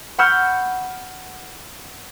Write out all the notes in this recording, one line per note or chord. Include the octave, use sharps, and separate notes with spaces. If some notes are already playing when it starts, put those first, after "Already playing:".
F#5 B5 C#6 E6 F6 G6